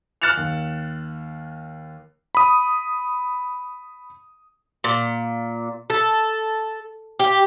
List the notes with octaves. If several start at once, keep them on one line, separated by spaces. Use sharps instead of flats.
F6 F#6 A6 C#7 E7 F7
D#2
B5 D#6
A#2
A4
G4